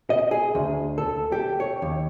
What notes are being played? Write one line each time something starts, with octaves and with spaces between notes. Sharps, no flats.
D#5
G#4
D2
A4
G4
C#5
D#2